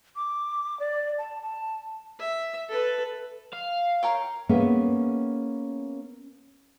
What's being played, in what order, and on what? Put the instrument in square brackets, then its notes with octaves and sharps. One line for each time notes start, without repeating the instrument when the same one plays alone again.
[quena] D6
D5
A5
A5
[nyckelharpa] E5
A4 B4
[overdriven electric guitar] F5
[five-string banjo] A#4 C#5 G5
[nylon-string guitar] A#3 B3 C#4 G#4 E5